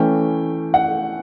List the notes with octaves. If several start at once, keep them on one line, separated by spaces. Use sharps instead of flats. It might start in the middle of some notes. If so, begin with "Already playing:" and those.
Already playing: E3 A3 C#4 G5
F#5